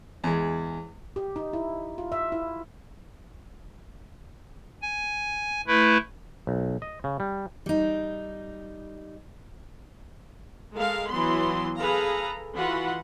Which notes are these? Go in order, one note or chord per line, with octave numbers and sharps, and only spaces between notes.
E2 G#3
G4
D#4
E4
F4
E5
E4
G#5
A3 E4 B4
B1
D#5
C#3
G3
G3 D#4
G#3 A4 A#4 F5
E3 F#3 B3 C6
G#4 A4 B4 F5 A#5
E3 F4 F#4 B4 F#5